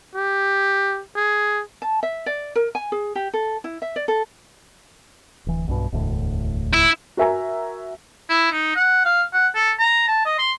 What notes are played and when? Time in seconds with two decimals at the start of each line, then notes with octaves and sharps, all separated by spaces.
0.16 G4
1.16 G#4
1.82 A5
2.03 E5
2.26 D5
2.56 A#4
2.75 G#5
2.92 G#4
3.15 G4
3.34 A4
3.64 E4
3.82 E5
3.96 D5
4.08 A4
5.46 D1 E3
5.67 B1 G2 B2
5.92 E1 D2 A2
6.74 E4
7.17 F#4 A#4 E5 G#5 A#5
8.29 E4
8.52 D#4
8.76 F#5
9.05 F5
9.33 F#5
9.55 A4
9.79 A#5
10.08 A5
10.26 D#5
10.39 C6